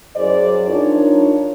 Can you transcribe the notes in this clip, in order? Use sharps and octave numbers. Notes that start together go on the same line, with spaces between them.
F#2 F#3 E4 G#4 C5 D5
D4 D#4 F4 A#4 C#5